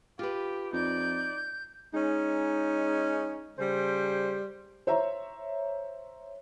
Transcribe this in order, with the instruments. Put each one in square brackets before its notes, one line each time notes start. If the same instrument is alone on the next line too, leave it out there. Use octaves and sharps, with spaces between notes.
[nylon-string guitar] F4 B4 [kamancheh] G4
[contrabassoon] F2 [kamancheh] D#4 D5 [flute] G6
[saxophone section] G#3 C#4 D#4
C#3 G3 C5
[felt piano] C5 C#5 E5 A#5